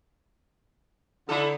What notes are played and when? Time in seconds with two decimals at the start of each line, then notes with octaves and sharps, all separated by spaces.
1.29 D3 D#4 E4 A4